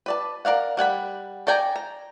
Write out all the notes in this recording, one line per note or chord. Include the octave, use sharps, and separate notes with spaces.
B4 D5 A5
A#4 D5 F5 F#5
G3 F#5 G#5 B5
A4 D5 G5 G#5 A#5
A#5